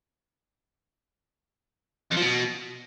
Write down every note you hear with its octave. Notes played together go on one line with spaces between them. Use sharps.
F2
F3
B2